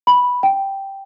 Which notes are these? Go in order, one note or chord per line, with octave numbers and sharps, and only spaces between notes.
B5
G5